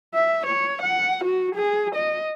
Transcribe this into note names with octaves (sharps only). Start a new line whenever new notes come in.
E5
C#5
F#5
F#4
G#4
D#5